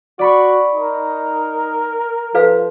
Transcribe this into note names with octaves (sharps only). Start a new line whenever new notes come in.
F#4 D5 B5 C#6
D#4 A#4
F3 A4 B4 F5